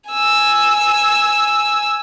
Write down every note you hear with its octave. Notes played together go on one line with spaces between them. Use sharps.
G#5 E6